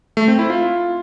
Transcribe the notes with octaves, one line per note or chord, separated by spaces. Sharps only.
A3
C4
E4
F4